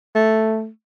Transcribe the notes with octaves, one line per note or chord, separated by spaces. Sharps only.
A3